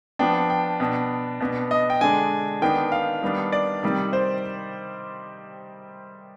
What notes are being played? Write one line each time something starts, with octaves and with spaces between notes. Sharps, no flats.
F3 B3 D4 G5
G5
B2 B3 D4
B2 B3 D4
D#5
G5
D3 G#3 D4 G#5
D#3 B3 D4 G5
F5
D#3 G3 B3 D4
D5
C3 D#3 G3
C5